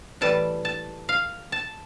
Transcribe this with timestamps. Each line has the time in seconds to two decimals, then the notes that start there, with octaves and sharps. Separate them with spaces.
0.21 A2 E3 G3 A5
0.65 A5
1.09 F5
1.52 A5